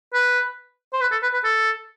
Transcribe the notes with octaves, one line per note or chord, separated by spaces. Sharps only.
B4
C5
B4
A4
B4
B4
A4